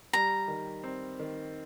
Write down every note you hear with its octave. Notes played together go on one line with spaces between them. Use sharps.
G3 A#5
D#3
C4
D#3